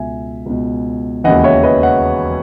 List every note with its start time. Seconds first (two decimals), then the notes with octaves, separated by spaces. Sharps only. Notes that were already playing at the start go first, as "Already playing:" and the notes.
Already playing: C#2 B2 E5 G#5
0.46 C#2 B2
1.24 E1 D#2 C#3 E3 D#5 F#5
1.44 C#5 E5
1.63 B4 D#5
1.83 D#5 F#5